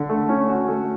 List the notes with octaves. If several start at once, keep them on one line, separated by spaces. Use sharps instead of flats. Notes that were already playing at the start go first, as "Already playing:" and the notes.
Already playing: D3
A3
C#4
F#4
A3